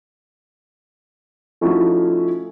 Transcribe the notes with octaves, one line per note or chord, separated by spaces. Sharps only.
F3 A3 C#4 D#4 E4 F#4